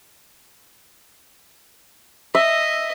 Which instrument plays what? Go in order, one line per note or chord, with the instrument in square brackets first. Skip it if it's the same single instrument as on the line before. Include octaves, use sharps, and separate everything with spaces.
[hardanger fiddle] D#5 [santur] E5